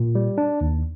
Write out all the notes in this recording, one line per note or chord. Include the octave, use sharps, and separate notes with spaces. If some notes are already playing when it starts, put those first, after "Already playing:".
Already playing: A#2
G3
D4
D#2